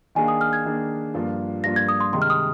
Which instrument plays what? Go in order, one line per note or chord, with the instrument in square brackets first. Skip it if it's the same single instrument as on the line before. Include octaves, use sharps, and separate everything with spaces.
[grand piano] D#3 A#3 D4 G#4 [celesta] G#5
[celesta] D#6
F6
G#6
[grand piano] D#3 A#3 D4 G#4
G2 F3 A#3 D4 F4
[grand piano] G2 F3 A#3 D4 F4 [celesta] A#6
[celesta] G#6
D#6
C6
[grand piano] C3 D#3 G#3 [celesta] C6
[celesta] F6
D#6